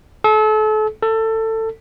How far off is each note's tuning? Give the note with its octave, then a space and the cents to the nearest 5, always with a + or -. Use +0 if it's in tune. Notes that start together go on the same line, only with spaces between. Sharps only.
A4 -35
A4 +20